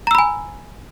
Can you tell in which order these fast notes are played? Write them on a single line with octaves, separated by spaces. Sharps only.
A#5 E6 B5 G#5